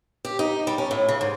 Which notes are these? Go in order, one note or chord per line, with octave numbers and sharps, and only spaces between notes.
G4
D#4
G3
C#4
A2
C#3
G#2